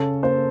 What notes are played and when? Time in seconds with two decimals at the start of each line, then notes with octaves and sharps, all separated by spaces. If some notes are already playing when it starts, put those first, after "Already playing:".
Already playing: C#3 C#4 A4
0.23 A#3 C5